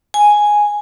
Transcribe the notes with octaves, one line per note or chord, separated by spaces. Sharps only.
G#5